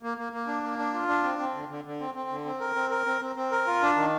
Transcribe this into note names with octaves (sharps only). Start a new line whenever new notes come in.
A#3
A#3
A#3
D4
A#3
D4
F4
D4
C4
C4
D3
D3
D3
C4
C4
D3
C4
A#4
C4
A#4
C4
C4
C4
A#4
F4
D4
D#3